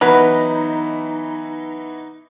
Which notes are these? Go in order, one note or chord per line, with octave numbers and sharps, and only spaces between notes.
E3 F#3 B3 D#4 E4 B4